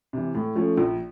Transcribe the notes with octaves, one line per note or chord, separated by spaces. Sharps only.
C3 E3
A2
F3 A3 C#4
A#1